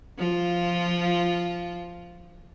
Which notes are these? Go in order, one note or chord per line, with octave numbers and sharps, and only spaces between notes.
F3 F4